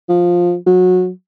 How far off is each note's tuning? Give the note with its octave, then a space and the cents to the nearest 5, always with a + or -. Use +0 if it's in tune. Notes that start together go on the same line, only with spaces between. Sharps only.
F3 +10
F#3 -20